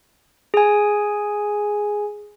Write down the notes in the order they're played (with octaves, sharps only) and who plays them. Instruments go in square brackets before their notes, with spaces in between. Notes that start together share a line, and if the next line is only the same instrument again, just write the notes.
[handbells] G#4 G#5